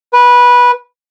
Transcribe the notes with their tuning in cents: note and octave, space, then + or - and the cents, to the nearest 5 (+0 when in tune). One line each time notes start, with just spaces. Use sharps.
B4 -15